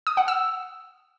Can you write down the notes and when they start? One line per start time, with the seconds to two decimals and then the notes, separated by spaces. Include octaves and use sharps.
0.07 D#6
0.17 F#5
0.28 E6